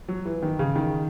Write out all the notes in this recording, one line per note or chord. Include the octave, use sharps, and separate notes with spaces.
F#3
E3
D#3
C#3
D#3